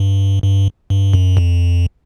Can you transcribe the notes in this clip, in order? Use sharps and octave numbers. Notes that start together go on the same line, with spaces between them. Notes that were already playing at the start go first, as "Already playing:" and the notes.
Already playing: G2
G2
G2
F#2
F2